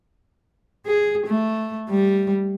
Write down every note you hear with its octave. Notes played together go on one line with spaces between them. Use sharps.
G#4
A3
G3